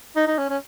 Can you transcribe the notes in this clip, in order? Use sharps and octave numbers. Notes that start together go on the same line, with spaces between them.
D#4
D#4
C#4
C#4